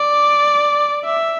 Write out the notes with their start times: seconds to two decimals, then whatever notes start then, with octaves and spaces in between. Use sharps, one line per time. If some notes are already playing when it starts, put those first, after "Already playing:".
Already playing: D5
1.04 E5